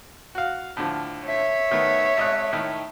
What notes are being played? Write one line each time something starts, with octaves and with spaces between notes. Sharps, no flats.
F#4 F5
A2 D3 F3
C#5 E5
D#3 A3 B3
G#1 D#5 F#6
A2 D#3